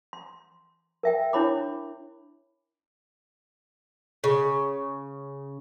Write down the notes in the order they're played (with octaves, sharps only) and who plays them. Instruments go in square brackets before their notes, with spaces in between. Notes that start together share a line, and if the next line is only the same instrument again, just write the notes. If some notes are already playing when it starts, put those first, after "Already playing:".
[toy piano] C6
A#4 E5 G5
D4 E4 C#5 B5 D6
[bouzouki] C#3